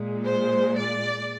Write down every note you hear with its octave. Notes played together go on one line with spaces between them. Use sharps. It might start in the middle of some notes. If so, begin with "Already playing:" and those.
Already playing: A#2 G#3
C5
D5